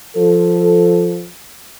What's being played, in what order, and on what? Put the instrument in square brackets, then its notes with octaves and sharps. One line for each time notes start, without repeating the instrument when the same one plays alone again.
[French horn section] F3 A4